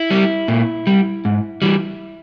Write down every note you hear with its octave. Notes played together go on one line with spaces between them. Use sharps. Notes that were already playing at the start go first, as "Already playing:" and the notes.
Already playing: E4
G3
A#2
G3
G#2
E3 G3